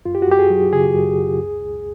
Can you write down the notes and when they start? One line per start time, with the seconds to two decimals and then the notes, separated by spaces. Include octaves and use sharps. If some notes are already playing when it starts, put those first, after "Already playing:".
0.05 F#2 F4
0.15 G4
0.22 F#4
0.28 F#2 G4
0.39 G#4
0.50 F#3
0.73 C#3 G#4
0.95 F#2
1.18 F#2
1.40 C#2
1.62 C#2